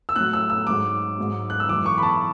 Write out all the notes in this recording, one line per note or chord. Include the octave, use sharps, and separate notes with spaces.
E6
A2 F#3 F#6
E6
E6
G#2 F#3 D6
G#2 F#3
F#6
E6
F#2 E3 D6
C#6
B5
A5